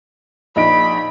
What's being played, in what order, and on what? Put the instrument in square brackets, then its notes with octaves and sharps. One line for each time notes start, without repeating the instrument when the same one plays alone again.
[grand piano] A#1 D#4 D7 [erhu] B5